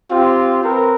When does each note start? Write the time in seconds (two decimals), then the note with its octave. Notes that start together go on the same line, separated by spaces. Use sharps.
0.11 C4 F4 G4
0.62 C4 A#4 B4